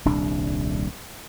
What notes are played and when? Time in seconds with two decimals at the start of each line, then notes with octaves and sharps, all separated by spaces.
0.05 D#1 C2 D4